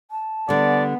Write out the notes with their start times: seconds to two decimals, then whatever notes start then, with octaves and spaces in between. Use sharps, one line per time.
0.11 A5
0.49 D3 G3 B3 D5